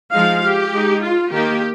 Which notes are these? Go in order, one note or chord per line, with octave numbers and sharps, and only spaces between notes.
F3 G#3 D#4 F5
G4
G#3 D#4
F4
D#3 A#3 D#4 G4